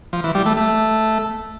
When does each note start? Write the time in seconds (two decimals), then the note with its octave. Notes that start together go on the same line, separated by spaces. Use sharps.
0.13 F3
0.24 E3
0.35 G3
0.46 A3
0.57 A3